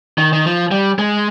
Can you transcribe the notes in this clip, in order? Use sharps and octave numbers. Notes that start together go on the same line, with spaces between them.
D#3
D#3
F3
G3
G#3